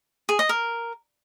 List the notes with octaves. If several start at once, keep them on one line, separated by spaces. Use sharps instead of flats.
G#4
D#5
A#4